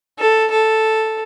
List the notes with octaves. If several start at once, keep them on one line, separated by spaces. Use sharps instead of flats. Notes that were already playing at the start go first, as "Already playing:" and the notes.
A4
A4